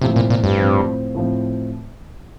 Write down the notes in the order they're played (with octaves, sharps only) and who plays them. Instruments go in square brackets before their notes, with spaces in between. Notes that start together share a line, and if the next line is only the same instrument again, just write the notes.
[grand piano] A2 F3 C4 [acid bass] C3
[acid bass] A#2
A#2
G2
[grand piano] A2 F3 C4
A2 F3 C4